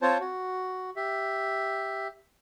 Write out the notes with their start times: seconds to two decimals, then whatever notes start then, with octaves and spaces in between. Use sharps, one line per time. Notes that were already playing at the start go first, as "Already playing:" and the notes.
0.02 C4 F4 C5 C#5 A5
0.20 F#4
0.96 G4 E5